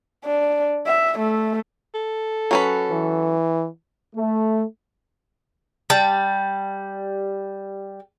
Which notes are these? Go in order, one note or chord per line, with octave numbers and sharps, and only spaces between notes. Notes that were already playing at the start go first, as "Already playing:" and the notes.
D4
E5
A3
A4
F#3 C#4 B4
E3
A3
G3 A5